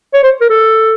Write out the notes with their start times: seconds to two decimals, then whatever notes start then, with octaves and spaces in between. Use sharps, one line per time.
0.14 C#5
0.23 C5
0.41 A#4
0.50 A4